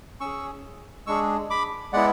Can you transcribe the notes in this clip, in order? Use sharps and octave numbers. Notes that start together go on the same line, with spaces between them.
C#4 G#4 C#6 E6
G#3 D4 G#4 C#6 E6
B5 D6
G#3 B3 E4 D5 F#5